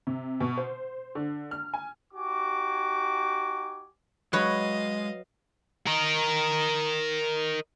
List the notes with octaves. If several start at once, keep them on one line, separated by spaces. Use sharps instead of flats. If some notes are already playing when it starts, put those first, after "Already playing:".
C3
B2
C5
D3
F6
G#5
D#4 F#4 G4 G#5 D6
F#3 G#3 B4 C#5 D#5 F5
A#4 D#5